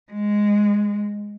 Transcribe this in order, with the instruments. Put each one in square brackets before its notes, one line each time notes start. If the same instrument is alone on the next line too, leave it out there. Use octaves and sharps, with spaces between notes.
[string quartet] G#3